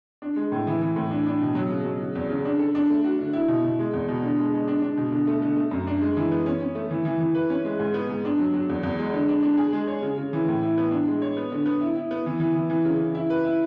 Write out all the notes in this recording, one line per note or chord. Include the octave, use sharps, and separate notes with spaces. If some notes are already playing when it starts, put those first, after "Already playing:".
D4
G#3
A2
E3
E3
A2
D4
D4
B2
F#3
C#3
F#3
C#3
E2
C#3
D4
A4
D4
A3
F#4
D3
E4
B2
B2
G#3
E2
B2
D3
G#3
G#3
D4
D4
B2
D3
A3
D3
A3
F#2
D4
G#3
E3
B3
C#4
C#4
A3
E3
E3
E3
B4
C#4
G#3
G#2
B3
G#2
D4
F#3
F#3
E2
E2
G#3
D3
D4
D4
G#4
G#3
C#5
C#3
C#3
E3
A2
E4
B3
D4
G#3
C#5
B3
D3
B3
E4
E4
B3
E3
E3
E3
E3
C#3
C#3
E4
B4
E4